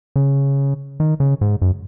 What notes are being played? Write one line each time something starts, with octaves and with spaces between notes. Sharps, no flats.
C#3
D#3
C#3
G#2
F#2